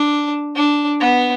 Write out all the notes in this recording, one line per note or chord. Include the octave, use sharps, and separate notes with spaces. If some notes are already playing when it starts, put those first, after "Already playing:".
Already playing: D4
D4
B3